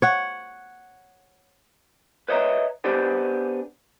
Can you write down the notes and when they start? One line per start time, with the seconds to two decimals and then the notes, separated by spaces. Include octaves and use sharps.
0.02 C#5 F#5
2.28 B4 C#5 D#5 E5 A#5
2.84 B3 D4 G4 G#4 C5 D5